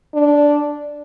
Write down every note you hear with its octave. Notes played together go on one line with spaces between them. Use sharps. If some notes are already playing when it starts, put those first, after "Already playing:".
D4